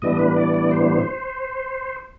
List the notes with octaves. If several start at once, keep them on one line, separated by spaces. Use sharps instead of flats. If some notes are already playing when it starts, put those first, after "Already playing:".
A2 E3 G3 B3 D4 D#5
B4
D5
D5
C5